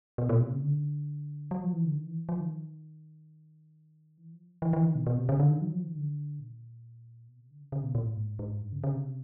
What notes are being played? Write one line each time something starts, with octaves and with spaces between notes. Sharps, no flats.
B2
A#2
C3
C#3
D3
F#3
F3
E3
D3
D#3
E3
F3
D#3
E3
F3
E3
E3
D#3
B2
B2
C3
C#3
D3
D#3
F#3
F3
D#3
D3
A#2
B2
C3
D3
C#3
C#3
B2
A#2
A2
G#2
G#2
G2
C#3
C#3
C3